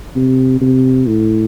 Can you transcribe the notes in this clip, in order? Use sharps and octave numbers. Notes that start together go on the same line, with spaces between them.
C3
C3
A2